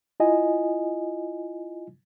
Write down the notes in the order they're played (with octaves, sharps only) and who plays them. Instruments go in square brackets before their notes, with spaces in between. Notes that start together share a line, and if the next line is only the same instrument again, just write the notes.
[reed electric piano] E4 F4 D#5 G#5